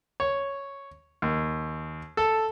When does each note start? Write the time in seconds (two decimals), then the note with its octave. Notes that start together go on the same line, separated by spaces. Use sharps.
0.20 C#5
1.22 D#2
2.17 A4